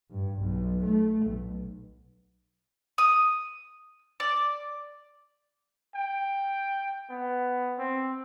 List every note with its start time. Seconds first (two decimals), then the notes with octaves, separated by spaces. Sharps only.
0.10 G2
0.40 B1
0.84 A3
1.26 B1
2.98 D#6
4.20 D5
5.94 G5
7.10 B3
7.78 C4